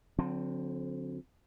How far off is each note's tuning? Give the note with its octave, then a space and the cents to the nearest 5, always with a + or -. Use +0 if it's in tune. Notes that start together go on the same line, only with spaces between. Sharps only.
D3 -25 F#3 -45 C4 +0